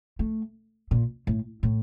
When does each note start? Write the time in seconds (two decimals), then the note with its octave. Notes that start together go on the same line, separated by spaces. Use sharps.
0.19 A3
0.91 A#2
1.27 A2
1.63 A2